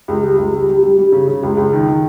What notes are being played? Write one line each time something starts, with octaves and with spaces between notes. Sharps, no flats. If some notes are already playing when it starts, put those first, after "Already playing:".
C#2
G3
C#2
G3
G3
G3
G3
C#3
C#3
C#2
C#2
D#3
D#3